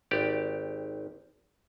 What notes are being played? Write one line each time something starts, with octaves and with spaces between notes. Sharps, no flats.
G#1 G4 D5